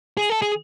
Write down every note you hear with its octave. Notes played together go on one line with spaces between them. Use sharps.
G#4
A4
G#4